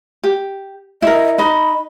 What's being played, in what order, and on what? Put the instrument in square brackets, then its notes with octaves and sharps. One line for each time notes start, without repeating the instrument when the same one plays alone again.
[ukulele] G4
[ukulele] E4 A#4 [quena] D#5
[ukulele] D#4 D#5 [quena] B5